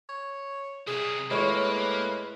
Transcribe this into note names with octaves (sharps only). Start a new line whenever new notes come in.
C#5
C2 C3 G#4
A2 G#3 A#3 B4 C#5 C#6